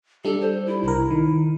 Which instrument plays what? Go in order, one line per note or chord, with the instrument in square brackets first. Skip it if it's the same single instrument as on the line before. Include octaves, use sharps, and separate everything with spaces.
[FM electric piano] G3 D4 [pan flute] A4
[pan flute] C5
E4
[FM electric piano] C2 A#4 [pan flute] E4
[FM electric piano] D#3